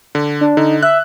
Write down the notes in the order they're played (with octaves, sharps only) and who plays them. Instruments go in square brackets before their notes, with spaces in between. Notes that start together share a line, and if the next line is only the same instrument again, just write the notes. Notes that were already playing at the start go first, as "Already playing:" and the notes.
[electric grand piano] D3
[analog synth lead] D4
[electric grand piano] D3 [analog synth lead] D#4
[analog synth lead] E5 [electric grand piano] F#6